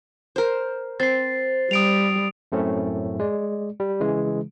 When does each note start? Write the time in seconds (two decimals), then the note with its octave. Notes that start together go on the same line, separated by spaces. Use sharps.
0.36 A#4 C5
1.00 C4 C5 A6 C7
1.71 G3 D#6 D7 F7
2.52 F#2 A2 A3 C4 C#4
3.20 G#3 D5
3.80 G3
4.00 C#3 E3 G#3